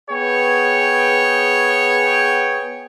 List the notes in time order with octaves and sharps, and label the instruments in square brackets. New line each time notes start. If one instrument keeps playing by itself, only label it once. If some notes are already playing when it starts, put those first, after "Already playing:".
[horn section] B3 G#4 C#5 G5